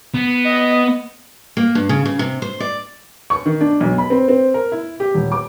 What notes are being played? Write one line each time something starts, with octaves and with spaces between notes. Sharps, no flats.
B3
D#5
A#3
G2
C#3
C#3
C3
C5
D5
C#6
D#3
D4
B1
B5
C4
C4
A#4
E4
G4
D#1
D6